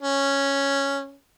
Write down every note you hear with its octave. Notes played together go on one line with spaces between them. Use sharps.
C#4